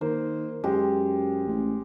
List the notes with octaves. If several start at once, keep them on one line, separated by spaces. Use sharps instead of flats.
D#3 A#3 C5
F#2 G#3 G4
A1